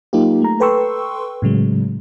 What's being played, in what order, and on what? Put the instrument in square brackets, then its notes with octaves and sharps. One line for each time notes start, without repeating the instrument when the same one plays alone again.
[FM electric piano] F#3 A#3 D#4 F4 G4
A3 A#5
A4 B4 G5 C6 C#6 E6
A2 C#3 F#3 G#3